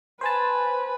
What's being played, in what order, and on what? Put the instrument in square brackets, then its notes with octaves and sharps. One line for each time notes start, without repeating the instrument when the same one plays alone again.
[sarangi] B4 [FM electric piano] C5 G#5 A5